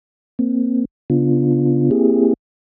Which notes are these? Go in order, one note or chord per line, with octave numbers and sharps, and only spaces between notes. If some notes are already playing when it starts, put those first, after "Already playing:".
A#3 C4
C#3 B3 D4 F4
A#3 C4 E4 G4 G#4